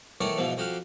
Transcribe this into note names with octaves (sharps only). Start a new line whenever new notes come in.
E2 D#3 A3 C#5 D5 C#6
G#2 B2 E3 F3
F2 F#4 G4 F5